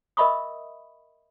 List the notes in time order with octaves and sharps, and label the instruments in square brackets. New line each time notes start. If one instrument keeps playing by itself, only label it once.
[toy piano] A#4 D#5 E5 B5 C#6 D#6